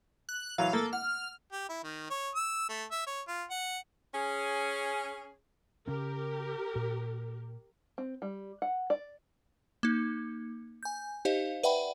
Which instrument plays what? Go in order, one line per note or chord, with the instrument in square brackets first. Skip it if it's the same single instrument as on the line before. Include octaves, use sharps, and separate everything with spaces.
[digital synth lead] F#6
[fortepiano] E3 F#3 [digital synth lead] F5
[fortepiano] A#3 [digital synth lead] A4
[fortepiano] F#5 [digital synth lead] F6
[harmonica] G4
E4
D#3
C#5
E6
A3
E5
C#5
F4
F#5
[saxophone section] C#4 G#4
[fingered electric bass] C#3 C#4 [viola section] G4 A#4
[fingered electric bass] A#2
[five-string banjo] C4
G3
F#5
D5
[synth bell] A#3 D#4
G#5 G6
D#4 G4 C5 D#5 F5
B4 D5 E5 F#5 G5 B5